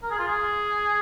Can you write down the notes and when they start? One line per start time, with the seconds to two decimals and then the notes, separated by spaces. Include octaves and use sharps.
0.03 A#4
0.11 G#4
0.19 F4
0.27 G#4